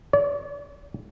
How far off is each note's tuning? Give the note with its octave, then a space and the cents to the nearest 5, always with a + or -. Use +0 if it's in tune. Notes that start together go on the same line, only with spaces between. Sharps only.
D5 -40